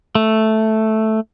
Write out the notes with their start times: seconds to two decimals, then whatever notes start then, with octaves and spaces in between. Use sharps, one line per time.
0.15 A3